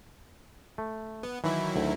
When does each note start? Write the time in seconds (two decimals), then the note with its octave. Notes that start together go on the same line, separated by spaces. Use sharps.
0.78 A3
1.23 B3
1.44 D#3 E3 F#3 E4
1.76 D2